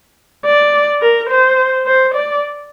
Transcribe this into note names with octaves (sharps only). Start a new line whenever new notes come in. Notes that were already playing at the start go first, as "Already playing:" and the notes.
D5
A#4
C5
C5
D5